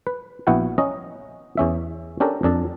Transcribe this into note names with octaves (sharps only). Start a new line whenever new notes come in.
B4
A#1 B3 E4 F#4 F#5 G5
C#4 D#5 A#5
E2 C#4 E5
C#4 D4 G4 A4 A#4
F2 D4 A4 A5